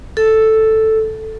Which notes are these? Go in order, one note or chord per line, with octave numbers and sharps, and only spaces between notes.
A4